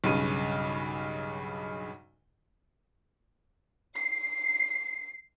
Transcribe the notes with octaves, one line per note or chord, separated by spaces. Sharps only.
B1 G2 C#3 D#7
C7